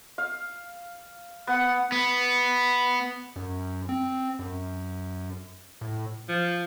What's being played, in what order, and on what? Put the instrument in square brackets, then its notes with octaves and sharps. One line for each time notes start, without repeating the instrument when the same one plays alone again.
[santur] F5
[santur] B3 [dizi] F#5
[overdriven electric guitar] B3
[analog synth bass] F#2
C4
F#2
A2
[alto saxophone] F3